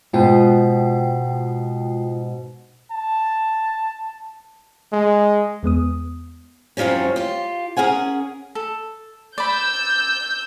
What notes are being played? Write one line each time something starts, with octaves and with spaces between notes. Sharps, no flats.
G#2 B2 G#3 F4 G5
A5
G#3
E2 G#3 B3 D#6
F#2 C3 F3 G3 C#4
F4 G4
C#4 G#4 A#4 F#5 G#5
A4
D5 B5 E6 G6